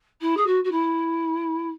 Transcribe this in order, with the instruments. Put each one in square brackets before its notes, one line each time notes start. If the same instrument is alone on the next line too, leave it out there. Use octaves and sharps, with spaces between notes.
[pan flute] E4
G#4
F#4
F#4
E4